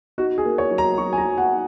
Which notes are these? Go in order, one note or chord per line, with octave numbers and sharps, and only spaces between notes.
D#4 F#4
G#4
A#3
C#5
F#3
A#5
F#3 C#6
G#5
A#5
F#3
F#5
D#4